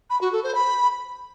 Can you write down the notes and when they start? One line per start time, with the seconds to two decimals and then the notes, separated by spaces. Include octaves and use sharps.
0.10 B5
0.21 F#4
0.32 A4
0.43 C5
0.55 B5